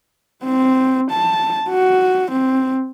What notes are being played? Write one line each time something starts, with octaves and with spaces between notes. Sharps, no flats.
C4
A5
F#4
C4